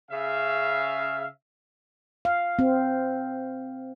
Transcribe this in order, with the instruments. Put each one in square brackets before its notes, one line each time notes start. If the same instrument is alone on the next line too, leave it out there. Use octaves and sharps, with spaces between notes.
[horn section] C#3 E5 F5
[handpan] F5
C4